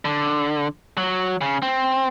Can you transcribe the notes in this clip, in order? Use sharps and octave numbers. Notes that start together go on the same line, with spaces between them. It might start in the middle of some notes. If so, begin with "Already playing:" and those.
D3
F#3
C#3
C4